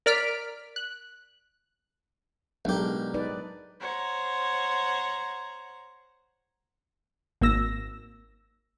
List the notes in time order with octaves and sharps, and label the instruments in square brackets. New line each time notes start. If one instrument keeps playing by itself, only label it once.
[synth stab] A#4 D5 F6 B6 D7
F#6
[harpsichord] B1 G4 [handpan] G#3 D4 A#4
[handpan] D#4 B4 D5
[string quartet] C5 C#5 F#5 A#5
[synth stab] G#1 A#3 E6 A#6